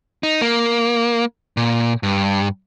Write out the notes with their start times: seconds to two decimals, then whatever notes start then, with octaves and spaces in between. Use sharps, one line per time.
0.23 D#4
0.41 A#3
1.57 A#2
2.03 G2